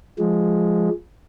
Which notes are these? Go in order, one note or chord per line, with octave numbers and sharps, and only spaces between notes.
F3 G#3